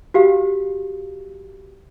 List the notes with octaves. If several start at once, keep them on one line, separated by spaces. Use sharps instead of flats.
F#4 G4 F5